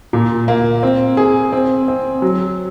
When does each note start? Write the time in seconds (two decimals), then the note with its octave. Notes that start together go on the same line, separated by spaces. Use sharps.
0.13 A#2
0.48 A#3
0.83 C4
1.17 G#4
1.53 C4
1.88 C4
2.22 F#3